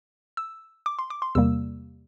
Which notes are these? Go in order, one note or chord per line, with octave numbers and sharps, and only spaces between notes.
E6
D6
C6
D6
C6
E2 C3 G3 A#3 E6